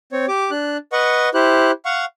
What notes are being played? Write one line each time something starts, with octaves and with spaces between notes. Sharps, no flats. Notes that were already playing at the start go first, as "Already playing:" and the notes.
C4 C#5
G4 D6
D4 F#6
B4 D#5 F#5 C#6
E4 G4 C5 F#6
F5 F#5 C#6